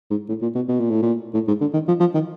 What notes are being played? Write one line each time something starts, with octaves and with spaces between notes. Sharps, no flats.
G#2
A2
A#2
B2
B2
A#2
A2
A#2
A2
G#2
D3
D#3
F3
F3
D#3